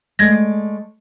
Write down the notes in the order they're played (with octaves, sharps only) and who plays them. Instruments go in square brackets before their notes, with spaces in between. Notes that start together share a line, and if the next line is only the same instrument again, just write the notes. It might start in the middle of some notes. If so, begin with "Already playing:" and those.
[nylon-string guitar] G#3 A3 D5 [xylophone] G#6 A#6